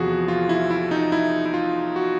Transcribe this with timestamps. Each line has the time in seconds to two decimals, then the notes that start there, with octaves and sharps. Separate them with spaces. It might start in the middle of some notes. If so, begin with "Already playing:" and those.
Already playing: E2 C3 F3 F#4 G#4
0.28 F4
0.49 E4
0.71 E4
0.91 D#4
1.12 E4
1.46 E4
1.54 F4
1.96 F#4